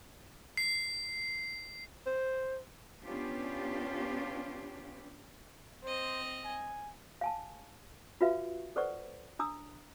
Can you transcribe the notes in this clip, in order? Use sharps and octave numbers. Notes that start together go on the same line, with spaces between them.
C7
C5
B3 C#4 D4 F4 G4
C4 C5 D#5
G#5
F5 G#5 A5
F4 F#4 B4 E5 F5
A4 B4 C5 D5 F#5 C#6
D4 A#5 D#6 E6